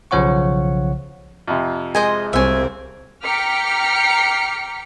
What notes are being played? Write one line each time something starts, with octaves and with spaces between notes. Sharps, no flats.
B1 C#3 F3 C#5 F#5 C#6
F2 C3
G#3 C5 D#5 G#5
C2 C4 F4 C#5 E5 G#5
G5 A#5 D6 F6 B6 C#7